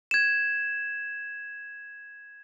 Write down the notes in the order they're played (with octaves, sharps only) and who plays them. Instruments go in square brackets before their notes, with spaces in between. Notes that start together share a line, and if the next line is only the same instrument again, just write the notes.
[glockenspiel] G#6 E7